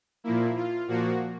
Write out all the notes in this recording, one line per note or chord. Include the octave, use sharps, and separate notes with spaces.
A#2 F3 A#3 E4
F4
A#2 F3 A#3 F#4